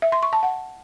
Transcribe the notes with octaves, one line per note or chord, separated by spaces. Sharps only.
E5
C6
C#6
A5
F#5